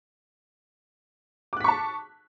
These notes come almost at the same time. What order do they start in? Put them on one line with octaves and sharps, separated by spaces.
D6 F#6 B6 C#6 A5